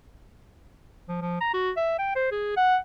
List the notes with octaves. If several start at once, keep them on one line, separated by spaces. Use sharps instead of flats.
F3
F3
A#5
F#4
E5
G5
C5
G#4
F#5